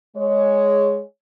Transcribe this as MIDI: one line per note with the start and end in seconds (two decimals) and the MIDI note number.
0.16 1.00 56
0.16 1.00 73